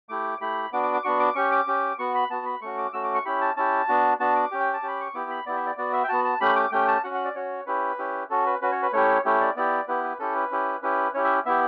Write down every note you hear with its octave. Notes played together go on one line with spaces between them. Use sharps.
A3 E4 G4 D6
A3 E4 G4 B5
B3 D4 F#4 D6
D6
D6
B3 D4 F#4 C#6
D6
C#4 G4 C#6
D6
C#4 G4
B3 F#4 C#6
B5
B3 F#4 A5
B5
A3 C#4 F#4 C#6
D6
A3 C#4 F#4 E6
D6
C#6
C#4 E4 G4 B5
A5
C#4 E4 G4 A5
B3 D4 F#4
B3 D4 F#4 A5
D6
C#4 G4
G5
A5
C#4 G4 B5
C#6
B3 E4 G4 D6
B5
B3 E4 G4 D5
E5
D5
B3 F#4 D5
E5
G5
B3 F#4 A5
A5
A3 C#4 G4 B5
D6
A3 C#4 G4 G5
A5
C#4 F#4 F#5
F#5
D5
C#4 F#4 C#5
C#4 E4 G4 B4
C#4 E4 G4
C#4 F#4 A4
B4
C#4 F#4 B4
C#5
B4
A3 C#4 E4 G4 C#5
A3 C#4 E4 G4
D5
B3 E4 G4 D5
B3 E4 G4 B4
B4
C#4 E4 G4 A4
B4
C#4 E4 G4
C#4 E4 G4 B4
C#4 E4 G4 C#5
E5
B3 E4 G4 E5